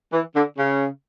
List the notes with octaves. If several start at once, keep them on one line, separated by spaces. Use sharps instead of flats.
E3
D3
C#3